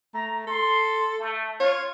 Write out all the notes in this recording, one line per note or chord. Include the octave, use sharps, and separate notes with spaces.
A3 A#5
A4 C6
A3
F4 C#5